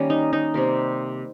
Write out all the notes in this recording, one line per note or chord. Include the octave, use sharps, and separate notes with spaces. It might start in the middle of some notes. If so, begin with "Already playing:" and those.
Already playing: D#3 G3 A#3 C#4
D#4
D#4
C3 G3 A#3